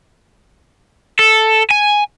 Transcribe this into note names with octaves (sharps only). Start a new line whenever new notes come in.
A4
G#5